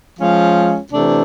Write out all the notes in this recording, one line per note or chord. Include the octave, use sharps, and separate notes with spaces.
F3 G#3 C#4 F4
C3 E3 A3 D4